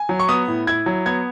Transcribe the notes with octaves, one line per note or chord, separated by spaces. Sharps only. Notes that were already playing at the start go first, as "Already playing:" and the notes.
Already playing: G#5
F#3
C#6
B3 D#6
A2
E4 G#6
F#3
B3 G#6